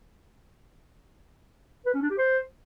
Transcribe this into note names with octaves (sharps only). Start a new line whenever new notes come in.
B4
C#4
D4
G4
C5